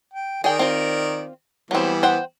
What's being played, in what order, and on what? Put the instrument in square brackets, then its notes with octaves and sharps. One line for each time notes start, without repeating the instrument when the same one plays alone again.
[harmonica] G5
[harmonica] D#3 A#4 D5 [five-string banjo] G#4 G5
[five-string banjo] C4 F4
[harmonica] E3 G3 B3 [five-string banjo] F#3 C4
[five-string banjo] C5 F#5 G5